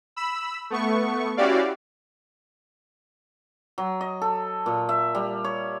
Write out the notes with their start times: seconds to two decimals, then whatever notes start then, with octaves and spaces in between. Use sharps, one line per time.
0.16 B5 E6
0.70 A3 B3 C#6
1.37 C#4 E4 F#4 G4 D5 F5
3.78 F#3
4.01 D#5
4.22 A4
4.66 A#2
4.89 E5
5.15 G3
5.44 C#5